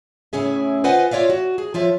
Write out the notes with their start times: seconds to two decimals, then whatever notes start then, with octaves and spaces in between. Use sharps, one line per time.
0.33 A2 C#3 C#4 E4 G#4 E5
0.84 F4 B4 C5 D#5 F#5 G#5
1.11 F4 C#5 D5 E5 F5
1.30 F#4
1.58 G#4
1.74 F3 F4 C#5 E5